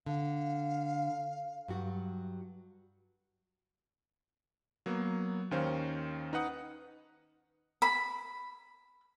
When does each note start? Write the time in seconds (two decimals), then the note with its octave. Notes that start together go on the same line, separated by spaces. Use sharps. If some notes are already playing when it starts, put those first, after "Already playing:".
0.06 D3 F5
1.68 G2 F#3 F#4
4.86 F#3 A#3 B3
5.51 D#2 D#3 C#4 C5 F5
6.33 D#4 B4 F#5 D#6
7.82 B5